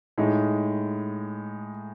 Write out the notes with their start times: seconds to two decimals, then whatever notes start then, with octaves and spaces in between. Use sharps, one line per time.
0.18 A2 G#3 D#4